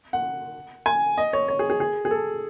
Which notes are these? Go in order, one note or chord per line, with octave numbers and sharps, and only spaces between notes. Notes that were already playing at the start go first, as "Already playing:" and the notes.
F#5
G#5
D#5
C#5
C#5
G#4
G#4
G#4
G#4
A4